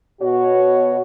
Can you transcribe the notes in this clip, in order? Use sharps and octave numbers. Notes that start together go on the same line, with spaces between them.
B2 F#4 C#5